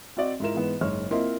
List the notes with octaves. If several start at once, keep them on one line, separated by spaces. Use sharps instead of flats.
C4 F#4 D5 D#5
G#2 E4 F4 A#4 E7
G#2 E3 B3 B4
F#1 G#2 C#5 F6
A#3 C4 E4 F4 C5 D#5